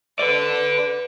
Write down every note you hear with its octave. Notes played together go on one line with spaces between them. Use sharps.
A4 B4 D5